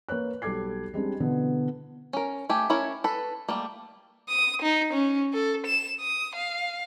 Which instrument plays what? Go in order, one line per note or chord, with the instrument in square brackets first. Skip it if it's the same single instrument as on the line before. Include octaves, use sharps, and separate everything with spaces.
[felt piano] A#3 B4 C#5 F#6
B1 G3 A4 D6 G#6 C7
G3 G#3 C4 D4
B2 D3 E3 B3
[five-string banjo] C#4 A#4
A3 G4 G#5
C#4 E4 A#4 C#5
A4 B4
G3 A3 A#3
[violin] D#6
D#4
C#4
A4
E7
D#6
F5